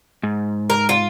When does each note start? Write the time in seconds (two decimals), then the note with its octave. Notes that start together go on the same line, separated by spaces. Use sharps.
0.23 G#2
0.70 A#4
0.89 F4